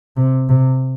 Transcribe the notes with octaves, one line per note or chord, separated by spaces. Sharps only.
C3
C3